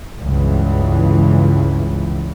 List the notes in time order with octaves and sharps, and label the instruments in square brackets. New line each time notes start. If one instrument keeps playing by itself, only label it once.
[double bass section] C#2 G2 E3